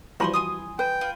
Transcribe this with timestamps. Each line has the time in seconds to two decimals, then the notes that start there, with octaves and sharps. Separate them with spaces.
0.20 E3 F3 G3 F#4 C5 G#5 B5 C6
0.34 G#5 C6 D#6
0.79 B4 G5
1.01 F4 B5